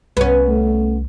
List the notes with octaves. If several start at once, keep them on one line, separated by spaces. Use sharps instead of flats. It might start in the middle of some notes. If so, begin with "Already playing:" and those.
C2 B3 C#4
A3